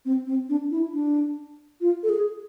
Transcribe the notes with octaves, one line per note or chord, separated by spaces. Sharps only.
C4
C4
D4
E4
D4
F4
A4
G#4